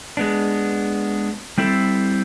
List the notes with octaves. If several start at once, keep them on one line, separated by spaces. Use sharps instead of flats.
G#3 B3 D4
G3 C4 E4 A4